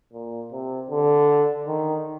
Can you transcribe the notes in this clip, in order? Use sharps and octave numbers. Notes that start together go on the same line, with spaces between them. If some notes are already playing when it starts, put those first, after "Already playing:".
A#2
C3
D3
D#3